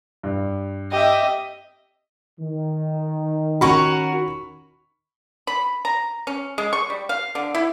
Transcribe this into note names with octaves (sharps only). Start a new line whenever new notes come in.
G2
G4 D#5 E5
D#3
C#4 F#4 A#4 B5 C#6
B5
A#5
C#4
G#3
C#6
G3
F5
D3
E4